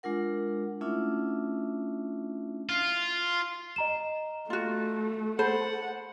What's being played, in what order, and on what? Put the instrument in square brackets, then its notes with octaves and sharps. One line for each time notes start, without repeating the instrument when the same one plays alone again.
[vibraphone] G#3 D4 F4 A#4 F#5
A3 C#4 D4 E4 F4 E5
[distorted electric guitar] F4
[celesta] D#5 A#5 E7
[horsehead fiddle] A3 [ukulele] F4 F#4
[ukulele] A4 C5 [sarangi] F#5 [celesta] B5